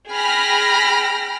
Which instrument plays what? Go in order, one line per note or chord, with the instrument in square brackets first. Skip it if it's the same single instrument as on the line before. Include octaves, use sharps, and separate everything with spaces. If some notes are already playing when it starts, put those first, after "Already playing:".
[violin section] G#4 G5 B5 F6 A#6